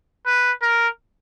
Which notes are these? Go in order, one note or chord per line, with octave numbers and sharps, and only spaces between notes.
B4
A#4